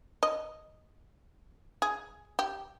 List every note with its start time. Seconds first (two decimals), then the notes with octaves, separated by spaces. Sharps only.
0.23 D#5
1.82 G#4
2.39 G4